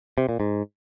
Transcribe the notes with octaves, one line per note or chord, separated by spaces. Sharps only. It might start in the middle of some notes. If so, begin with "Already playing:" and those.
C3
A#2
G#2